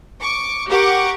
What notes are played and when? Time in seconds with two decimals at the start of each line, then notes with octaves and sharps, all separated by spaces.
0.20 C#6 D6
0.69 G4 A#4 F#5 C#6 D6